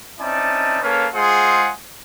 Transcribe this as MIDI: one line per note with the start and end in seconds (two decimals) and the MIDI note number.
0.19 0.78 60
0.19 0.78 61
0.19 0.78 63
0.19 0.78 64
0.19 0.78 74
0.19 0.78 81
0.81 1.07 58
0.81 1.07 61
0.81 1.07 69
0.81 1.07 71
0.81 1.07 73
0.81 1.07 77
1.13 1.70 56
1.13 1.70 65
1.13 1.70 68
1.13 1.70 72
1.13 1.70 78
1.13 1.70 84